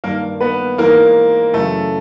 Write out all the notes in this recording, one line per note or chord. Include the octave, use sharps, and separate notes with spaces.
G2 D#3 A#3 A#4
B3 B4
G#2 E3 A#3 A#4
F#2 C#3 E3 A3 A4